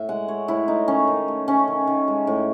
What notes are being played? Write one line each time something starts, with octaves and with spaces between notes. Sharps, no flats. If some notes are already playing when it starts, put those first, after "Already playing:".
Already playing: A2 E5
G#3 F#5
G#3 C#5
A2 E4
A2 D#4
D#3 C#4
D#3
A3
A3 C#4
D#3
D#3
G#3
A2